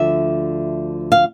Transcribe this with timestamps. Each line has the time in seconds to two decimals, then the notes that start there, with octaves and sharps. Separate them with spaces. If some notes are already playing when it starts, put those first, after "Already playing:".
Already playing: D2 D3 F3 E5
1.12 F5